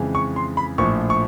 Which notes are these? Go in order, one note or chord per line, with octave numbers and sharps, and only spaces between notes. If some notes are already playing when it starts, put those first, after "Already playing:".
Already playing: F2 C#3 E3 G#3
C#6
C6
B5
A#1 A2 F3 C#6
C#6